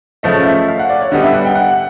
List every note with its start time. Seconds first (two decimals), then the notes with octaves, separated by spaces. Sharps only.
0.23 C#3 F3 A3 D#5
0.45 E5
0.68 F5
0.79 F#5
0.90 D5
1.01 C#5
1.12 D3 G3 B3 D#5
1.22 E5
1.34 F#5
1.45 G5
1.55 F#5